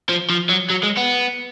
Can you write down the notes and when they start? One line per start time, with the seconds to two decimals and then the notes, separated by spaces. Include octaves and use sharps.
0.09 F3
0.30 F3
0.50 F#3
0.71 F#3
0.84 G#3
0.97 B3